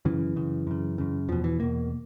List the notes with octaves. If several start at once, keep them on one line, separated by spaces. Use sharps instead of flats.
F#2 C#3 E3
F#2 C#3
F#2 C#3
F#2 C#3
E2 B2 F3
E3
E2 B2 A#3